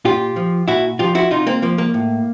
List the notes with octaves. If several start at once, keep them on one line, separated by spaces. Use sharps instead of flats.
A#2 F4 G4
F3
A#2 E4 F#4
F3 F4 G4
E4 F#4
C3 D#4 F4
A#3 C4
F3 A#3
A#3
A2